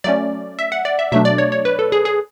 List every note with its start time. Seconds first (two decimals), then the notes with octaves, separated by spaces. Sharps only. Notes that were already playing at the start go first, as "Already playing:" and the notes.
0.04 F#3 A3 C#4 D5
0.59 E5
0.72 F#5
0.85 D5
0.99 E5
1.12 B2 F#3 A3 D4 E5
1.25 D5
1.38 C#5
1.52 C#5
1.65 B4
1.79 A4
1.92 G#4
2.05 G#4